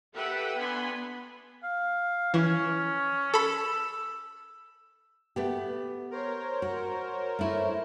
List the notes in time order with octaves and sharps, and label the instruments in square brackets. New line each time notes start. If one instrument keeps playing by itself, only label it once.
[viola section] G4 A4 B4 E5 F#5 G5
B3 D4 G#5 B5 C6
[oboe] F5
[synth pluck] E3 [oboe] C#4
[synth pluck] A4 B5 [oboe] E6
[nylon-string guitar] A3 B3 G4
[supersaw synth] A#4 C5 C#5
[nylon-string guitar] F#4
A3 E4